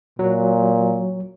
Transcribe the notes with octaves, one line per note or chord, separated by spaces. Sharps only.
A#2 F#3